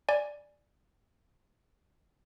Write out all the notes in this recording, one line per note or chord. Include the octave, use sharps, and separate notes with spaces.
D5 G#5